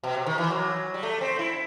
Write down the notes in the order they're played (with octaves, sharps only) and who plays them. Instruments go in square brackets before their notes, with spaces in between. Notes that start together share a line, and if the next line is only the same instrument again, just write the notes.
[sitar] B2
C3
D#3
E3
F#3
G3
A3
C4
E4